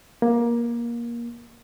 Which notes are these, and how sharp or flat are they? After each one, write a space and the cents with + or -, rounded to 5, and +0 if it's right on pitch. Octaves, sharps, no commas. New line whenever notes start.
A#3 +20